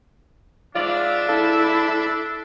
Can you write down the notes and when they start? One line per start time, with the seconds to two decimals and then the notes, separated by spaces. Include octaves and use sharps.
0.75 G#2 D4 F4 D5 E5
1.29 E4 A4